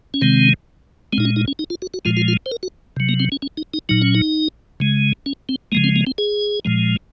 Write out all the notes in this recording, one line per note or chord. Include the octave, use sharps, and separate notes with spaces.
C#4
C3 D#3 G#3 C4
G#3 C4
A#2 D#4
C#4
D#4
C#4
D#4
F4
F#4
F#4
A#2 F3 G#3 F4
F4
F4
C5
A#4
F#4
C3 F#3
A#3
C4
C#4
C#4
D#4
D#4
A#2 F#3 D#4
C#4
D#4
C#3 G#3
C#4
C4
C#3 F3 G#3 A#3
C4
A#3
C4
G#4
A#2 F3 G#3